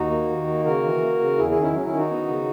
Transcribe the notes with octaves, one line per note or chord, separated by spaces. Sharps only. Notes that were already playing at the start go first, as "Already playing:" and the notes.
Already playing: D#2 D#4 F#4
A#3
D#3
A#3
C#3 F#4 A#4
E3
A#3
C#3
E2 E4 G#4
E4 G#4
D#3
C#4 E4
F#3 C#4
C#4 E4
D#3
D#4 F#4
B3
C#3